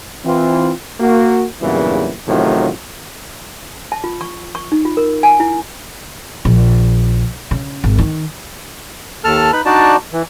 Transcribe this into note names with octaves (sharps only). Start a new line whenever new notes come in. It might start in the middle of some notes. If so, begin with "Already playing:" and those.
E3 C4 F4
A#3 F#4
E2 G2 A#2 C#3 E3 F#3
A1 A2 C3 D#3 F#3 F4
A5
F4
C#6
C#6
D#4
F4
A#4
G#5
E4
A#1
C#3
G#1
D#3
D#2 A4 A5 F6
D#4 B4 B5
D4 D#4 F#4 D5 A5
E3